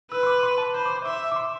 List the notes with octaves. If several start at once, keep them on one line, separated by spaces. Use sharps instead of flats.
B4 E6
C6
D6
C6
A5
C5 B5
D6
C6
E5 D6
D6
C6